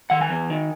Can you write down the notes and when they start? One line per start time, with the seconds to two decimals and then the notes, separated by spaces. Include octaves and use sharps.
0.10 D#3 F#5
0.21 G#5
0.30 E2
0.50 D#3